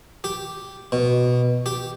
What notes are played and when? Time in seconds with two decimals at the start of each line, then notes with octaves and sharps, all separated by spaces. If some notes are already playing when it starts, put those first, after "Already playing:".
0.24 G4
0.92 B2
1.66 G4